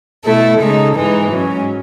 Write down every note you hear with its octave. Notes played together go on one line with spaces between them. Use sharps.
B2 A3 E4 A4
C#3 G#3 D#4 A4
G#2 E3 G#3 D#4
G#2 F#3 C#4